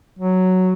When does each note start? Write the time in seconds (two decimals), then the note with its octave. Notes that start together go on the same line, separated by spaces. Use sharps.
0.19 F#3